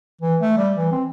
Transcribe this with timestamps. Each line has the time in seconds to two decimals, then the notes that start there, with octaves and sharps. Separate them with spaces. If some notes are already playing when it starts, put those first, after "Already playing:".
0.21 E3
0.40 A3
0.57 G3
0.77 E3
0.92 C4